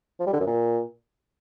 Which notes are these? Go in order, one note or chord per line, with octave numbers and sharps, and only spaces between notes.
F3
G3
D3
F#2
A#2